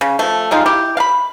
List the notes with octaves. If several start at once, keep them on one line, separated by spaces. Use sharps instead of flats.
C#3
F3 A3
G3 G#3 D#4 F4
E4 G4
F5 B5